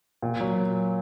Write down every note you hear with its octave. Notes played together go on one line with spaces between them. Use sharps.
A#2
F#3